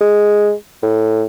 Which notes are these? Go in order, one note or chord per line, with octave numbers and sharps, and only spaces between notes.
G#3
A2